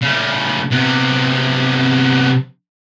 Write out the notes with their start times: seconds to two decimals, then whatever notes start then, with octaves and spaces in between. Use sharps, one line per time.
0.02 C#3 A3
0.71 C3 B3